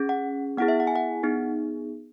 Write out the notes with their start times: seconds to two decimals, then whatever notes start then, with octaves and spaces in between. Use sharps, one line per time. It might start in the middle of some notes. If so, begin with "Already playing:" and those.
Already playing: C#4 G#4
0.09 F#5
0.57 B3 E4 G#4 F#5
0.68 E5
0.80 F#5
0.87 G#5
0.95 F#5
1.23 B3 D#4 G#4